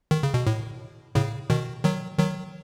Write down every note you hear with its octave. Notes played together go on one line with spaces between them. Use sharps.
D#3
C#3
B2
A2
A2 C#3
B2 D#3
D#3 F#3
D#3 F#3